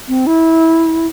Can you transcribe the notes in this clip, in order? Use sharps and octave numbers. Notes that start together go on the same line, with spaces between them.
C4
E4